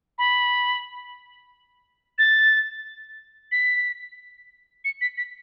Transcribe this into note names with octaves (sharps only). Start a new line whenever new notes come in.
B5
A6
B6
C#7
B6
B6